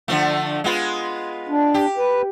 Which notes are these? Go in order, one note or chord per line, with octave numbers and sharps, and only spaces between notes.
D3 F3 A3
G#3 B3 F4
D4
G4
B4